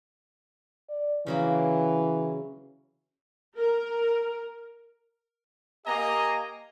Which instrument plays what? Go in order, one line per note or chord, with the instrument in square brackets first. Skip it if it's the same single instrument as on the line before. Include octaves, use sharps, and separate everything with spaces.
[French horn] D5
[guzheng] C#3 F#3 A#3 [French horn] E3
[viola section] A#4
[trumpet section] A#3 G4 D#5 G#5 A#5